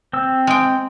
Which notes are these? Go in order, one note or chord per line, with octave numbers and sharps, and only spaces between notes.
C4 E6
G#3 G5